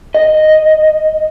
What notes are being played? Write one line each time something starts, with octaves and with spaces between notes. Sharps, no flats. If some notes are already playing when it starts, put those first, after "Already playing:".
D#5